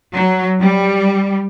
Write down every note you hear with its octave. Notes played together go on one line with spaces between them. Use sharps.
F#3
G3